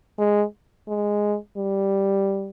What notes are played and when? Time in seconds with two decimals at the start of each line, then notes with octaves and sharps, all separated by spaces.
0.19 G#3
0.88 G#3
1.57 G3